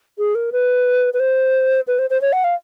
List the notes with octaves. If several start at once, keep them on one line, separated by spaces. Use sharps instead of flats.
G#4
A#4
B4
B4
C5
B4
C5
C5
C#5
F#5
F5